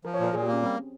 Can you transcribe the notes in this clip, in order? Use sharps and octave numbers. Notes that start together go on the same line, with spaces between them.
F3 A#4
C#5
A#2 A#4
A#2 G#4
G4
A#3
C#4
G3 C4